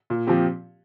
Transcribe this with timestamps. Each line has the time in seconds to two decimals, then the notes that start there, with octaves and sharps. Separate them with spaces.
0.10 A#2
0.27 F3 C4 G4